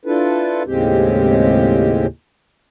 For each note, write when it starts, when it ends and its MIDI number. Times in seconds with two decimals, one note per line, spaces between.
0.06 0.63 62
0.06 0.63 64
0.06 0.63 65
0.06 0.63 69
0.06 0.63 71
0.66 2.07 39
0.66 2.07 45
0.66 2.07 49
0.66 2.07 56
0.66 2.07 60
0.66 2.07 67